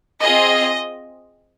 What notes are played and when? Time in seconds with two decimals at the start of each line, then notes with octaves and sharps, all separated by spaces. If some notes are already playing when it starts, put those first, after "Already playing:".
0.23 C4 F4 G#4 D#5